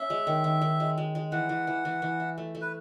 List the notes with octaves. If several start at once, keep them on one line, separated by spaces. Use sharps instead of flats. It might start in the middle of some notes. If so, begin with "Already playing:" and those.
Already playing: C#4 E5
G#3
D#3
D#3
D#3
G#3
G#3
G#3
E3 F#5
E3
E3
E3
E3
E4
A3
A3
B4